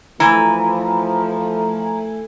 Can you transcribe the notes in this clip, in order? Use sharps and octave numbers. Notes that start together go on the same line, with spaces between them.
E3 F3 A3 A#5